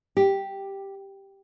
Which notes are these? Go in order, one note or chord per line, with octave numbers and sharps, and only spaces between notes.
G4